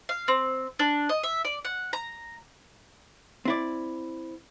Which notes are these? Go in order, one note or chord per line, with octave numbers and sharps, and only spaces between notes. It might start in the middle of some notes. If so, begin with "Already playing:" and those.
F5
C4
D4
D#5
E5
D5
F#5
A#5
C4 E4 D5